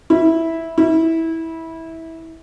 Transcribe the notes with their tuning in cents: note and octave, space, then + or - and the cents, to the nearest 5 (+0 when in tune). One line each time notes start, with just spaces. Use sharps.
E4 -10
E4 -20